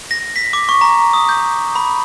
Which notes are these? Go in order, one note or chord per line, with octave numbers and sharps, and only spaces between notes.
A#6
B6
D6
C#6
A#5
D#6
G6
B5